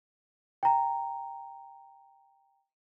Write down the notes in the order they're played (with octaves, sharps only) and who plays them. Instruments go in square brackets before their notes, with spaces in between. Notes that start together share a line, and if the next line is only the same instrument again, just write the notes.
[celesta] G5 A#5